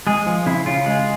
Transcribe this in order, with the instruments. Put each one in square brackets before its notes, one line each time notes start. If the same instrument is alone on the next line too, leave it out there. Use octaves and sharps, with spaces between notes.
[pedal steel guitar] G#3 G#4
F3
C#3 E4
C#3 F4
G#3